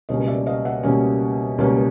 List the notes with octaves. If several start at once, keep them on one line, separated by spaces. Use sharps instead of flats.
C#2 B2 G3 A#3 C#4 C#5 D#5
D5 E5
D#5 F5
E5 F#5
C#2 B2 G3 A#3 C#4
C#2 B2 G3 A#3 C#4